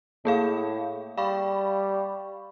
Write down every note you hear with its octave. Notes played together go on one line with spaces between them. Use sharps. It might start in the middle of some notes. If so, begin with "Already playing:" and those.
A2 A#3 G#4 F5
G3 F5 B5 C#6